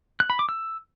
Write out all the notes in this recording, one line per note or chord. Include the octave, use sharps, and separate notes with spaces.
F#6
B5
D6
E6